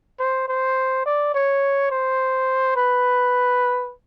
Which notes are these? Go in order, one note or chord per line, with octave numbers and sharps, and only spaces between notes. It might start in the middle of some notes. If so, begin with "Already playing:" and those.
C5
C5
D5
C#5
C5
B4